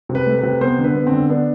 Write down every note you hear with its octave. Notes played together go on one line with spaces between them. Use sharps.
C3
B4
A3
C3 B4
B3 C5
D3
B4
B3
C4
D3
B3 D4